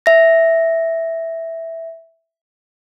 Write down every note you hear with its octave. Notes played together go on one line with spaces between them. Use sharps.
E5 A#6